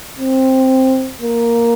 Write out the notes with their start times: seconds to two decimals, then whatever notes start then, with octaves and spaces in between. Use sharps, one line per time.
0.18 C4
1.21 A#3